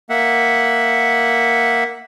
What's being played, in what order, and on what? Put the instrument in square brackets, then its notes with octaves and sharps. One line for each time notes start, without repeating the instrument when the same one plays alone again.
[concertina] A#3 E5 F#5